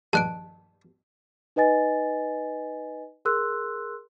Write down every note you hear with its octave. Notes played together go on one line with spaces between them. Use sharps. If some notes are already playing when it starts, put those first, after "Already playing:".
A#1 G2 D#3 A5 F#6 D7
D#4 B4 D#5 G#5 A6
G#4 A#4 C6 E6 F#6